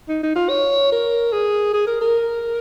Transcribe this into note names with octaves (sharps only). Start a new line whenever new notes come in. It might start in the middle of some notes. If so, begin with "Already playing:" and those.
D#4
D#4
F4
C#5
A#4
G#4
G#4
A#4
A#4